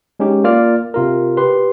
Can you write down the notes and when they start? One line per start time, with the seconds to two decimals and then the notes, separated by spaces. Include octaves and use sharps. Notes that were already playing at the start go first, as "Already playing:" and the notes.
0.20 G#3 C#4 D#4 G4
0.44 A#3 F4 D5 F6 A6
0.94 C3 F4 A#4
1.37 G4 B4 C6